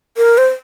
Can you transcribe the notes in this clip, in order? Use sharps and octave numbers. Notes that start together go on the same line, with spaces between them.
A#4
C5